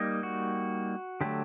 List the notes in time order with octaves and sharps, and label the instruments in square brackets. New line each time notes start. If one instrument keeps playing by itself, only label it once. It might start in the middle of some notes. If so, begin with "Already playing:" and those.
Already playing: [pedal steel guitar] G3 A#3 D#4 D#5
F#4
D3 F#3 A3 G4